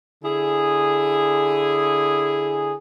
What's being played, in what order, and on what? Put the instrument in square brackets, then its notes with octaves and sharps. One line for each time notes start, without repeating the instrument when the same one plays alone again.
[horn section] D3 E4 G#4